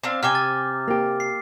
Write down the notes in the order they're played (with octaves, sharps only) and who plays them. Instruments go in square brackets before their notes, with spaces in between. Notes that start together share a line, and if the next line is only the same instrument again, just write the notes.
[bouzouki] C4 D4 F5
[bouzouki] C3 G5 G#5 [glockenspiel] D6 F6
[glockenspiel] A6
[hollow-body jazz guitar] A#3 G4
[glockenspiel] C7